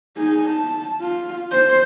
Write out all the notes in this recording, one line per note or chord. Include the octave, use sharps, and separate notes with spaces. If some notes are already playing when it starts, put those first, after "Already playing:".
D#4 G#4
A5
F4
C5